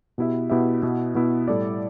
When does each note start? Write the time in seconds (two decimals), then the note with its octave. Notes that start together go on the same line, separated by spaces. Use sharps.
0.18 B2 B3 E4 G4 E5
0.50 B2 B3 E4 G4 E5
0.82 B2 B3 E4
1.15 B2 B3 E4
1.48 A2 G3 E4 A4 D5